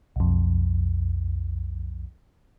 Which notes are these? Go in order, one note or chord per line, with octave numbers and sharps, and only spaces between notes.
B1 F2